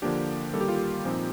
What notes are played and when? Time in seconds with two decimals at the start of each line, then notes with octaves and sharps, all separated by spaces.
0.02 D3 F3 A#3 D4 G4
0.53 D#3 G3 A#3 A4
0.61 G4
0.68 F4
0.76 G4
1.05 A#2 F3 C4 D#4